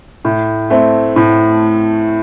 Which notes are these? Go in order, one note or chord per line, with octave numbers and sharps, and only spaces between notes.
A2
A3 C4
A2